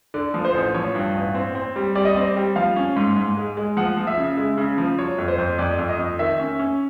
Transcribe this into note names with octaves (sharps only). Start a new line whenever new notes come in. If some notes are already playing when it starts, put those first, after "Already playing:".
D3 D5
F3
C5
A1
F3 C#5
G2
A1
C4
C4
G3
G3 D5
D#5
C4 D5
G3
F3 F5
C#4
G#2
G#2
G#3
G#3
F3 F#5
F3
E5
C#3
G#3
C#3
F3
F#3 C#5
F2
C5
F2
F2 D5
F2
D#5
F2
D#3 E5
C#4
C#4